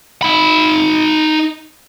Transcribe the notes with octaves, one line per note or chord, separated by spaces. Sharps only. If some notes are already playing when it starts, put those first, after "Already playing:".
D#4 B5